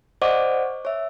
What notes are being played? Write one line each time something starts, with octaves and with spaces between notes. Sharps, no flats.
C5 D5 D#5 F#5 C#6 D6
C#5 E5